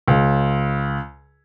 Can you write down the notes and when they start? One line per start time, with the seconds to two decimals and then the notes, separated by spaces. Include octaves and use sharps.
0.08 C#2